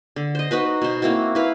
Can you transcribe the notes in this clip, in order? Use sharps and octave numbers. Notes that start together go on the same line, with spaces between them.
D3
C5 D#5
D#4 F#4 B4 C5
B2 C5
A#3 C4 E4 F#4
E4 B4 F5